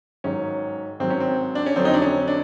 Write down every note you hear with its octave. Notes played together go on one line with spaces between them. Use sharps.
G#2 D#3 F#3 C#4
G#2 D#3 F#3 C4
C#4
C4
D4
C#4
F2 D3 F#3 C4
D#4
D4
C#4
D4